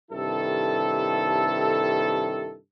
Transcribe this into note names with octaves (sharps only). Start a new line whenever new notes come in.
G2 C3 D#3 E4 A4